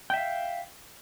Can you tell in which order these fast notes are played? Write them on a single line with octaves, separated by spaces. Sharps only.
G5 E5 F5